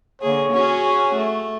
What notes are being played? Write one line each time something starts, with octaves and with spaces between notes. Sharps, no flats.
D3 A#3 G#4 C#5
C#4 F#4 G#4
A3